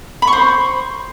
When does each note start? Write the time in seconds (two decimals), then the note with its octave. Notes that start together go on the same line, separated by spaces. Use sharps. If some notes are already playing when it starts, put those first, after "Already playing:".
0.22 B5
0.27 C#6
0.33 C5